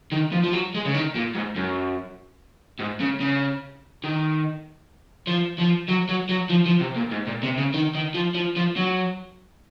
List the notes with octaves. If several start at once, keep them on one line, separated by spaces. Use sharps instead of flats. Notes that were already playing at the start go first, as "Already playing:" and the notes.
D#3
F3
F3
F#3
G#3
C#3
D#3
A#2
G#2
F#2
G#2
C#3
C#3
D#3
F3
F3
F#3
F#3
F#3
F3
F3
C3
A#2
G#2
A#2
C3
C#3
D#3
D#3
F3
F3
F3
F#3